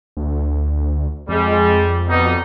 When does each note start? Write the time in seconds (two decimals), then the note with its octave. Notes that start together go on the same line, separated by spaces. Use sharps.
0.17 D2
1.29 F2 G3 G#3
2.08 B2 G3 D#4